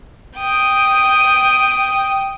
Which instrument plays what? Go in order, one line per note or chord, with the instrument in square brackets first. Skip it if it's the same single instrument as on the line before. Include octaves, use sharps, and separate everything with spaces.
[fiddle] G5 D#6